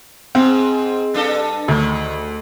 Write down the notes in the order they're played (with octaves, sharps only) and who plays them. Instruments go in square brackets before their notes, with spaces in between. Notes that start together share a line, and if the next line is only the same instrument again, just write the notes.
[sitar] G#2 [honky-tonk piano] C4
[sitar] G2 D4 A4
[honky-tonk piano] D2 [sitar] D#3